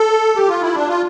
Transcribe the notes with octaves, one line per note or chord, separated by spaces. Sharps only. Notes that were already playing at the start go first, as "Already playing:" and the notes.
Already playing: A4
G4
F4
E4
D4
F4